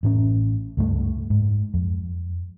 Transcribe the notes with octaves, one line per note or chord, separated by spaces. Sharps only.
A1 A2 C4 C#4
C#2 G2 A3
G#2
F2